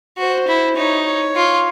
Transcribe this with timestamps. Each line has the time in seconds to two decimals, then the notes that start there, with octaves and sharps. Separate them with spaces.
0.17 F#4 C5
0.48 E4
0.76 D#4 C#5
1.06 C#5
1.36 F4